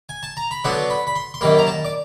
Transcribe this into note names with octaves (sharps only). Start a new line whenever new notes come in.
G#5
A5
A#5
B5
D3 F#3 B3 D4 C6
B5
B5
C6
C6
F#2 D#3 G3 A#3 B5
A#5
A5
D5